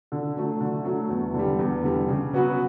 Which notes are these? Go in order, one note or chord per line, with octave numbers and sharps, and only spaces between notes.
D3
F#3 A3
D3
F#3 A3
E2
D3
G3
E2
D3 G3
C#3
F#3 B3 F#4 B4